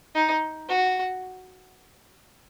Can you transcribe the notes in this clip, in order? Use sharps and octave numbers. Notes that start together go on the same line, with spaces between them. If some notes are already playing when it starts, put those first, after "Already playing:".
D#4
F#4